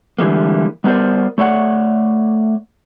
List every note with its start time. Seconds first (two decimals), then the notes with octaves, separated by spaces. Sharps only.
0.19 D3 E3 G3 G#3 A#3
0.84 G3 B3 A#4 C5 D5
1.38 A3 C#5 D5 F#5